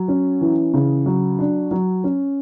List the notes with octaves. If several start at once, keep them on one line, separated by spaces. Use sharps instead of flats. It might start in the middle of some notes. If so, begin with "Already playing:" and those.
Already playing: F#3
C#4
E3
C#3
F#3
D4
F#3
C#4